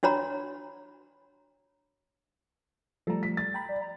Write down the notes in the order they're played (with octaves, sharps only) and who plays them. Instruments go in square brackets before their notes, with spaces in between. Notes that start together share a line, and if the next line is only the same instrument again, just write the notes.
[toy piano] D4 F#4 C#5 A#5 B5
[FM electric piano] F3 A3 [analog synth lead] G3 [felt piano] A4 A#5
[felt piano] B6
A6
[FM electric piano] G5 A#5 B5
[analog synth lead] D5
A#5